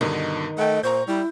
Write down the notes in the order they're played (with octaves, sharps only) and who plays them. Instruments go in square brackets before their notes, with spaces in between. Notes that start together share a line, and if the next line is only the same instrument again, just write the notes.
[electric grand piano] G2 B2 D3 [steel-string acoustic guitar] D#3 D#4
[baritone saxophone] A3 [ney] D#5 [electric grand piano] F#5 G5
[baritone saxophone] A#2 [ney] C5 [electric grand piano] A#5 C#6 G6
[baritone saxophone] G3 [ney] E4